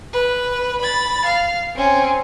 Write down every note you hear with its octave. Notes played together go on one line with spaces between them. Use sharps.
B4
B5 A6
F5
C4 C#4